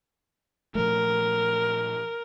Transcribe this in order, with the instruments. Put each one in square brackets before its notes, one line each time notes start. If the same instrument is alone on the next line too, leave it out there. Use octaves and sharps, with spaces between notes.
[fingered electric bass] A#2 F3 A3 [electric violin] A#4